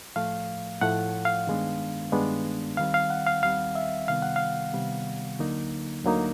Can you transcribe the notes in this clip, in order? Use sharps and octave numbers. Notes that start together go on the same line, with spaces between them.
A2 F3 A3 F5
A2 F3 A3 F#5
F5
G2 D#3 G#3 B3 D4
G2 D#3 G#3 B3 D4
D#2 D#3 G3 C4 F5
F5
F#5
F5
D#2 D#3 G3 C4 F5
E5
C3 D#3 G3 B3 F5
F#5
F5
C3 D#3 G3 B3
D2 D3 F#3 A#3 D#4
D2 D3 F#3 A#3 D#4